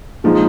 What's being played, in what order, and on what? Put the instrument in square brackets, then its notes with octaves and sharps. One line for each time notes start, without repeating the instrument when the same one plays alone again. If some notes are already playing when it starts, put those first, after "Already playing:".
[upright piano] A#2 F3 G#3 D#4